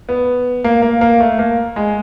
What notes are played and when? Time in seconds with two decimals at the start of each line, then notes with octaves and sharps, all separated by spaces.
0.09 B3
0.64 A#3
0.82 A#3
1.01 A#3
1.20 A3
1.39 A#3
1.76 G#3